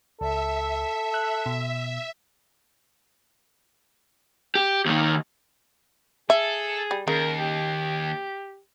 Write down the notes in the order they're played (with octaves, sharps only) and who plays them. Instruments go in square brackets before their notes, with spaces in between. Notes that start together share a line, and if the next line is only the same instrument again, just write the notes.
[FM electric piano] C#2 [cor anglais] A4 [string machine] E5
[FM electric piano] F#6
B2
[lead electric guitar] G4
D#2 D#3
[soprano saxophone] G#4 [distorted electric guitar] A4 [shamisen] E5
[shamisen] G3
[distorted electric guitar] D#2 [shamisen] C#3 [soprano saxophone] A#4
[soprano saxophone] G4